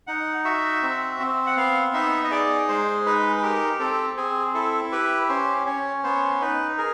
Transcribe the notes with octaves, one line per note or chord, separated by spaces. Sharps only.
D#4 F#5
F#4 E5
C4
C4
F#5
B3 F5
D#4 E5
D#5
G#4 D5
G#3 C5
D#4 B4
B4
G4 A#4
C4 A4
C4 G#4
E4 A4
G4 B4
C#4 C5
C#4 C#5
B3 C5
D#4 B4
G#4 A#4